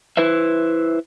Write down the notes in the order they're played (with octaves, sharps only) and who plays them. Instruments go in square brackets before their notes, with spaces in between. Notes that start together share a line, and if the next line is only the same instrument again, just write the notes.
[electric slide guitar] E4 B4 C5 E5